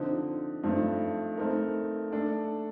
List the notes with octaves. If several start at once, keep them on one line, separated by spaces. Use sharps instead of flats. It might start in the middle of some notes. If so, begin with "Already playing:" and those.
Already playing: D3 F3 C4 D#4
G2 F3 A3 C4 D#4
A3 C4 D#4 A#4
A3 D4 A4